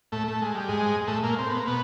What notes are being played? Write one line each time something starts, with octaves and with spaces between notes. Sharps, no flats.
A2 A3
A3
G#3
G3
G#2 G#3
A2 A3
A#2 A#3
C4
B3
A#3
B2 B3